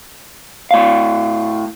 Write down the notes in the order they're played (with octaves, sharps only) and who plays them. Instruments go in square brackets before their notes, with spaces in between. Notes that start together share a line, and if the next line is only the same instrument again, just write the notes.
[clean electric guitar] A2 F5